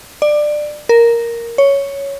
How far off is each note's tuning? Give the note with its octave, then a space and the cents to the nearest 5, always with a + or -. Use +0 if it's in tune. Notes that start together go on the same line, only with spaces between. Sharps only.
D5 +20
A#4 +0
C#5 +5